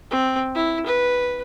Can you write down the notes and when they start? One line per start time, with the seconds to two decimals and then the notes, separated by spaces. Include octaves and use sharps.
0.11 C4
0.55 E4
0.87 B4